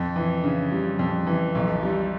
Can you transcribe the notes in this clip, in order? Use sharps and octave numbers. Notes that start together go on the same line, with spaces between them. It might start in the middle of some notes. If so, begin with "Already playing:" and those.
Already playing: F2
E3
C#3
G3
F2
E3
B1
G3